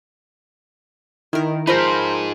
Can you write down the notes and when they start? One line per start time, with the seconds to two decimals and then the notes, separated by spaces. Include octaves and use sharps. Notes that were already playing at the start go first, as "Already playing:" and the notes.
1.33 D#3 E4 A#4
1.67 F3 D#4 F4 G#4 A#4 C5 A#5 B5